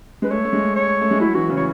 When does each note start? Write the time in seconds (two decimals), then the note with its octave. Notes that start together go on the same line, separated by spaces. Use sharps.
0.22 G#3 B4
0.31 A3 C#5
0.45 A3
0.53 G#3
0.76 C#5
1.01 A3
1.11 G#3
1.20 F#3 E4
1.35 E3 F#4
1.49 C#3
1.57 C#5